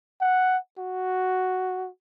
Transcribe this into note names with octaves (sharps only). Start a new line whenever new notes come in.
F#5
F#4